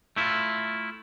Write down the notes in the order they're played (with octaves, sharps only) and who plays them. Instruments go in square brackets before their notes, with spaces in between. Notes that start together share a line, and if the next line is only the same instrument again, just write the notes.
[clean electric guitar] A3 E4 F4